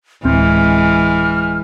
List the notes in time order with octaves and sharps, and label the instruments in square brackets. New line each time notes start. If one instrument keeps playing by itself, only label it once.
[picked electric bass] D1 C4 [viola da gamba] E3 G#3 [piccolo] F6